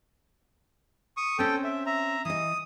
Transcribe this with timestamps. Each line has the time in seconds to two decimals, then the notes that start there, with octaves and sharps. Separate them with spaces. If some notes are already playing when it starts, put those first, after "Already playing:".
1.17 C#6 D#6
1.39 C4 C#4 A4 G5
1.64 E5
1.86 E5 A#5
2.25 E3 D#5 D#6